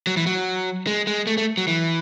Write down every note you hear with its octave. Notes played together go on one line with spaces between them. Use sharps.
F#3
E3
F#3
G#3
G#3
A3
A3
F#3
E3